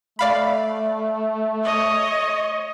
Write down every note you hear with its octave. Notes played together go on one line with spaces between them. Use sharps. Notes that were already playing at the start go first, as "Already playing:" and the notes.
A3 D5 F5 B5
C#5 D#5